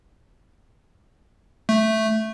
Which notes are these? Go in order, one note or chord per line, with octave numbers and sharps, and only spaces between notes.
A3